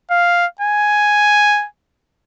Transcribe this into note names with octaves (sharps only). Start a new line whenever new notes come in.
F5
G#5